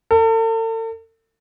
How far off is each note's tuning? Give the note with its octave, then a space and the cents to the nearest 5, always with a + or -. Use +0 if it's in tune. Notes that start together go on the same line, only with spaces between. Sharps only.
A4 +40